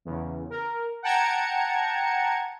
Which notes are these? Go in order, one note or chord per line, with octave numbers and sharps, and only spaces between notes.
E2 C#3
A#4
F#5 G5 A5 A#5 G#6 C#7